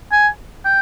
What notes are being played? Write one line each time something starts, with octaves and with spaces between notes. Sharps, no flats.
G#5
G5